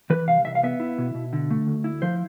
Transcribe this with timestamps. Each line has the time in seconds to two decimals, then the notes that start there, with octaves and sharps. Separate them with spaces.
0.10 E3 B4
0.28 C2 F5
0.45 C2 E5
0.55 F5
0.63 B3 E5
0.80 E4
0.98 B2
1.14 B2
1.33 D3
1.50 A3
1.67 D2
1.84 E4
2.02 F3 C5